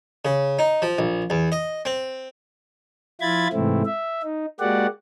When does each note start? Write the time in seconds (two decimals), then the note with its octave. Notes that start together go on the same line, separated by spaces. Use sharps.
0.25 C#3
0.59 D#4
0.82 F3
0.98 A#1
1.30 E2
1.52 D#5
1.85 C4
3.21 F3 E4 F4 B5 G#6 A6
3.53 G#2 C3 E3 A3 C4 E4
3.85 E5
4.23 D#4
4.60 G#3 A#3 F#4 G4 D5 F#5